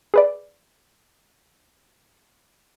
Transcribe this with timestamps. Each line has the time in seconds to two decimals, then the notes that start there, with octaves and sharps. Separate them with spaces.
0.14 G#4 B4 D5